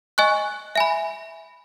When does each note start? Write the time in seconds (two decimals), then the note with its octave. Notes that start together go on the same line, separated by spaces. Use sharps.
0.18 D#5 G#5 C#6 F#6
0.76 E5 G#5 B5